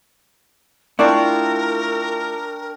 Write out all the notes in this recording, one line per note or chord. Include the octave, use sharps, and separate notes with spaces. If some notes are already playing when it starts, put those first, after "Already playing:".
A3 D4 E4 F4 A#4 D5 G5 C#6